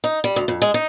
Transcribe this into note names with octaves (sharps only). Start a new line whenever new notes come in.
D#4
G3
D2
F2
G#3
D#4